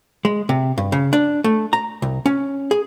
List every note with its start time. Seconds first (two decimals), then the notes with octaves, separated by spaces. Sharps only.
0.25 G#3
0.49 C3
0.78 G2
0.92 C#3
1.13 D4
1.44 A3
1.73 A#5
2.02 C2
2.26 C#4
2.71 G#4